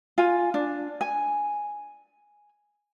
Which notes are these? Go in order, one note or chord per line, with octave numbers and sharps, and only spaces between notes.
F4 G#5
D4
G#5